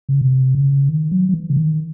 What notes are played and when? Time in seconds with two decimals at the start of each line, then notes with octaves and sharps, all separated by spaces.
0.09 C#3
0.21 C3
0.55 C#3
0.89 D#3
1.11 F#3
1.29 F#3
1.34 E3
1.50 C#3
1.56 D#3